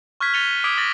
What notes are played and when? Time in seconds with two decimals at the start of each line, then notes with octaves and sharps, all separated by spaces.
0.20 C#6 F6 F#6 G#6 B6
0.34 A6 C#7 D#7 F7 G7
0.64 D6 D#6 G#6 B6 D7
0.78 D6 A6 A#6 F#7